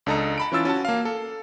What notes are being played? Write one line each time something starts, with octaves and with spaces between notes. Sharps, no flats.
C#2 D4 A4 D#5 A#5
A5 B5 D7
E3 C#4 F4 E6 A6
C#4 F#4 A5
A#3 F5
A4